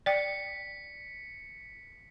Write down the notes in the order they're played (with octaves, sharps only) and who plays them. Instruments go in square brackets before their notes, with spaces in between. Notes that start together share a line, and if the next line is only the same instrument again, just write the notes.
[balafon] D5 G5 [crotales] B6 C#7